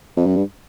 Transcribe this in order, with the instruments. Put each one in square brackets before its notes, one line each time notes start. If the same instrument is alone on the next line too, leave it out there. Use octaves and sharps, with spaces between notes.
[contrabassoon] F2
F#2
G2